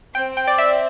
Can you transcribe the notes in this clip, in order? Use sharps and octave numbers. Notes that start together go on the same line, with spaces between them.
C4 G5
G5
D5
E5